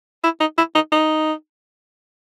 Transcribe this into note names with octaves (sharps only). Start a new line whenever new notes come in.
E4
D#4
E4
D#4
D#4